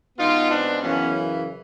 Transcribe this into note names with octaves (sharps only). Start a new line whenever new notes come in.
B2 G#3 B3 D#4 F4
C4 D4
F#2 C#3 E3 B3 C#4